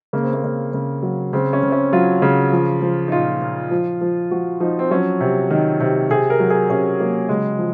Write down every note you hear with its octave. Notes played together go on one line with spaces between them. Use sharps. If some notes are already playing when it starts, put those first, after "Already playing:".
C#3 A#3
C4
A#3
C#3
C#3
F#3
C#3 C4
C#4
C#3
C4
C#4
F#3 F4
C#3
F3
F3
D#4
A#2 F4
A#2
F3
F3
F3 F#4
F3 D#4
C4
F#3 C#4
C3
D#3
C3
C3 G#4
A#4
F#3
G#4
C3 C#4
F#3 A#3
C#3 G#3
F3